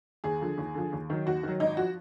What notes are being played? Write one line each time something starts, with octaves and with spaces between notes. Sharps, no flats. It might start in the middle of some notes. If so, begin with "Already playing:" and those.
D#2 G#4
D3 F3
D#2
D3 F3
D#2
D#3 F#3
D#2 F#4
D#3 F#3
G#1 D#4
F3 F#4